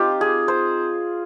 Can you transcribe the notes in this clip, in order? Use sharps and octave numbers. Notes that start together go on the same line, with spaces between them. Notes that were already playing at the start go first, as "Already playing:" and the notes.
Already playing: C4 D#4 F4 G4
G#4
C5